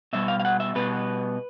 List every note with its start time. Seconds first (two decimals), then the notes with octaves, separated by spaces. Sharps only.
0.13 B2 G3 B3 E5
0.28 F5
0.39 F5
0.45 F#5
0.60 E5
0.75 B2 G3 B3 B4